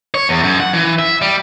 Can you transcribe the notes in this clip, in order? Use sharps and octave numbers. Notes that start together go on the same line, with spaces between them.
C#5
E2
F#2
F#5
E3
E5
G3